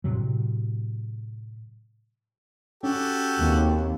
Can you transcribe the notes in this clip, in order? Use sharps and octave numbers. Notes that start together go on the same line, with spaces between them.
A2 C3 F#3
C#4 F#4 G4 A4
D#2 A#3 C4